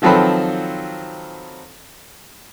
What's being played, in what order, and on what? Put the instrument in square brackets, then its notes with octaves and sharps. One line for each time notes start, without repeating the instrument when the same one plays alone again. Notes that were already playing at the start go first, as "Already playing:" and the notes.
[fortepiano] D#3 F3 F#3 C4 A4 B4